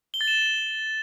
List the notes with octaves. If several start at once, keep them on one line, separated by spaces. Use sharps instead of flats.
G7
A6
E7